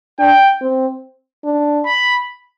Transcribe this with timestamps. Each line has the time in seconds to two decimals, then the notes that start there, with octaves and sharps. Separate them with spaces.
0.19 D4 G5
0.61 C4
1.44 D4
1.86 B5